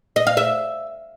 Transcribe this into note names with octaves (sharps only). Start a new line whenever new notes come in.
D#5
F5
E5